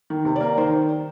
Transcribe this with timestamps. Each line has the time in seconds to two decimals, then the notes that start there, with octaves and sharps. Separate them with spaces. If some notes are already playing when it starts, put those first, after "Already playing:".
0.10 D#3
0.25 C3
0.36 D5
0.41 A#3
0.57 D#3 C5